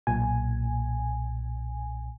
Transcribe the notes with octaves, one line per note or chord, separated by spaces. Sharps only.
B1 A#2 G#5